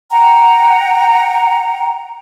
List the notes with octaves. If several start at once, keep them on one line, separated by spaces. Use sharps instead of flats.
F#5 G5 A#5